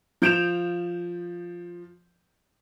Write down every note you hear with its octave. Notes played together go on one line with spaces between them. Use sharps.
F3 G6 D7 E7 F7